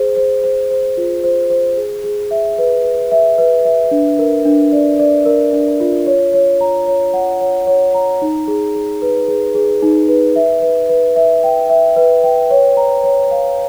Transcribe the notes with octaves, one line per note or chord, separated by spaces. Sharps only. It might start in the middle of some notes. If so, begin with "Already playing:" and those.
Already playing: G#4 C5
C5
C5
C5
F4
C5
C5
G#4
G#4
E5
B4
B4
E5
B4
E5
D4
A#4
D4
D5
D5
A#4
D4
F4
C#5
C#5
A#5
C#5
F#5
C#5
C#5
A#5
D#4
G#4
G#4
B4
G#4
G#4
D#4
B4
E5
B4
B4
E5
G5
E5
B4
G5
C#5
A#5
C#5
F5